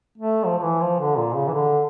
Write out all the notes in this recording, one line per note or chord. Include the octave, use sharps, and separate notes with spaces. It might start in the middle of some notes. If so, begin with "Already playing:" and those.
A3
F3
F3
E3
F3
D3
A#2
C#3
E3
D3